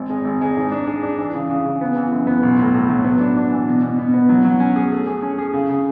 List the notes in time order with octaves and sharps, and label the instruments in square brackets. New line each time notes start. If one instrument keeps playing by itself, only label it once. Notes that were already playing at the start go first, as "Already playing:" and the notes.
Already playing: [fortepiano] G#1
G#3
G#1
G#3
G#2
D4
G#4
D4
E3
C#3
C#3
C#3
B3
E3
F#2
B3
B1
A2
A2
F#3
B3
D4
D4
E3
B2
B2
B2
B3
F#3
F#3
C#4
G#4
A3
G#4
C#4
G#4
C#3
C#3